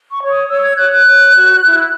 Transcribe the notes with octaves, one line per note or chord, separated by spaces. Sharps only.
C#6
C#5
D#6
C#5 E6
G#6
C#5 F#6
F#6
C#5
F#4
E4